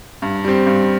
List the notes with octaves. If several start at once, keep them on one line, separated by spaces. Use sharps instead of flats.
G2
G3 C4
G2